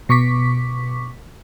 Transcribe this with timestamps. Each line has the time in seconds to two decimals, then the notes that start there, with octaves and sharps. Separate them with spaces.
0.09 B2 C#6 D6 B6